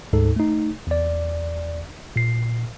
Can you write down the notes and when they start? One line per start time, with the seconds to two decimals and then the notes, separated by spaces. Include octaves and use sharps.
0.13 D2 G#2 D#4 A4
0.36 A3 D#4
0.87 E2 D5
2.16 A#2 C7